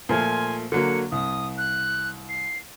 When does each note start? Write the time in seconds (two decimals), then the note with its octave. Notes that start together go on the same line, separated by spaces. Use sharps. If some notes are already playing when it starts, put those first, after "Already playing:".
0.09 A#2 F3 A3 G#5
0.72 D3 F#3 A#3 C#7
1.12 C2 D#6
1.58 F#6
2.29 C7